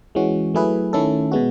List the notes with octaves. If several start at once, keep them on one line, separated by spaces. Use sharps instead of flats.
E3 G#3 C#4 F#4
F#3 A3 E4 G#4 B4
D#3 A3 C#4 E4 A4
B2 G#3 B3 F#4